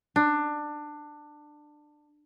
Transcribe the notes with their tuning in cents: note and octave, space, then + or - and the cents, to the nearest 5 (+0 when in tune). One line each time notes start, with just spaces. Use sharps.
D4 +20